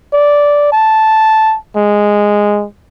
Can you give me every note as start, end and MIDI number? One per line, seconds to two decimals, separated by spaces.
0.13 0.71 74
0.72 1.57 81
1.76 2.66 56